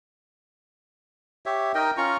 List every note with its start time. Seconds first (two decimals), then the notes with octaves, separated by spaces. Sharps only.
1.46 G4 C#5 E5
1.75 D#4 A#4 D#5 G5
1.97 C#4 F4 A#5 C#6